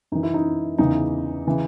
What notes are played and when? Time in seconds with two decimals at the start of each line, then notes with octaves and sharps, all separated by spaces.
0.12 F#2 E3 D#4
0.23 E4
0.34 D#4
0.78 E2 C#3 E3 D#4
1.47 C#3 E3